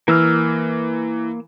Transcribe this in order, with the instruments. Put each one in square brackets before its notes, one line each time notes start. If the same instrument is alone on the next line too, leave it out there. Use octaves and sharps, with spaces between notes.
[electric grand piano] E3 [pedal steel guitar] A#3 E6 F6